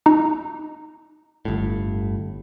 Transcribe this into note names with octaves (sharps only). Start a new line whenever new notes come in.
D#4 A#5
G1 A2